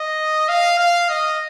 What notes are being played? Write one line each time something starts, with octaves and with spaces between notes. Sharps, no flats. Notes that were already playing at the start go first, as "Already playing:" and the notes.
Already playing: D#5
F5
F5
D#5